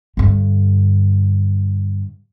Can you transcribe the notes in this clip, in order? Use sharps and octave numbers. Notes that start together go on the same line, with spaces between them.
G2 D3